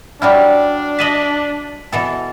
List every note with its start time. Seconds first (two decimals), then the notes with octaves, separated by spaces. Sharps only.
0.22 F#3 G3 D4 E4 D5 G5 F6
0.99 D#5 E5 A5 B6 D#7 F#7
1.92 B2 E3 A4